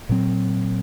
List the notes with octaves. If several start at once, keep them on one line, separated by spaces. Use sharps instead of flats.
A#2 F#3 C4